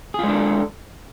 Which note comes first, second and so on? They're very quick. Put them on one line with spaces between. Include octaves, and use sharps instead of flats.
G#4 F4 G#3 D4 A4